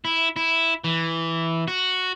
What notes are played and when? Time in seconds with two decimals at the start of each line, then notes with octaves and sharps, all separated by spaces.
0.05 E4
0.36 E4
0.84 E3
1.68 F#4